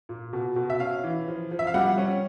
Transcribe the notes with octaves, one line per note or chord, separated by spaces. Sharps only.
A#2
B2
B2
E5
C#4 F5
E3
F3
F3
E5
F5
G3 F#5
C#4